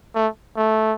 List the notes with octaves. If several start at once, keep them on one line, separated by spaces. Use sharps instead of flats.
A3
A3